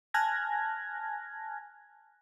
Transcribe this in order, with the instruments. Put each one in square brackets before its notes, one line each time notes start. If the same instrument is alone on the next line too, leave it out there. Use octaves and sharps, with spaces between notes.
[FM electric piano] G#5 A5 F6 F#6 G#6 A#6